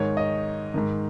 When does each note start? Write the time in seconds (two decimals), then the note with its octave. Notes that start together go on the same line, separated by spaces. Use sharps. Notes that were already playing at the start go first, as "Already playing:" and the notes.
Already playing: G#2 D#3 C#5
0.17 D#5
0.74 G#2 D#3